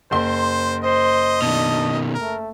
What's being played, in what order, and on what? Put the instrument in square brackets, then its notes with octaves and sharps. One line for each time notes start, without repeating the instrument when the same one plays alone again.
[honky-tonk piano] F#1 C6 [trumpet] C5
[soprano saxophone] C5 [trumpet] D#5
[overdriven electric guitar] B2 D#3 [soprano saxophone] D4
[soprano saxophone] A3 [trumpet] A#4